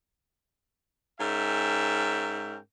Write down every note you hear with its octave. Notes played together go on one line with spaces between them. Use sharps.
G#2 C#4 A#4 E5 G5